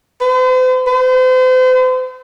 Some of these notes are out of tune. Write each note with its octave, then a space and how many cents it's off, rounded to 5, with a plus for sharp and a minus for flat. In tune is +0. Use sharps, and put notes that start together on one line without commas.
C5 -45
C5 -40